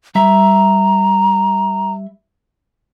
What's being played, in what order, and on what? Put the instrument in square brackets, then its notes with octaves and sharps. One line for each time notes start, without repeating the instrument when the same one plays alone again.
[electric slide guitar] G3 E5 [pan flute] A#5